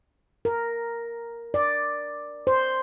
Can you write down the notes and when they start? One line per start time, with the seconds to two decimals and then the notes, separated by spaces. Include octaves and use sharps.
0.45 A#4
1.54 D5
2.47 C5